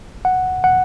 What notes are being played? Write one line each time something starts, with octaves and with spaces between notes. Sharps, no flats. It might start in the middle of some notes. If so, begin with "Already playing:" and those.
F#5
F#5